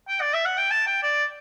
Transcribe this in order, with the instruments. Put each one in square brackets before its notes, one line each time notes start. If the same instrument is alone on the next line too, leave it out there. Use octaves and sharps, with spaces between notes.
[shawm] G5
D5
E5
F#5
G5
A5
G5
D5